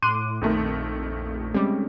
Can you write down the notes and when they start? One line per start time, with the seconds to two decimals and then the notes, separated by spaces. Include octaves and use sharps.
0.02 A2 C6 D6 F#6 D#7
0.41 A#1 F2 D#3 A3
1.54 G3 G#3 C4 C#4 G4